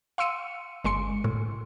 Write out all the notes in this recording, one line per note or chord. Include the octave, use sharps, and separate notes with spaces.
F5 C6 E6 C#7 D#7
G1 G#3 C6 C#7
A2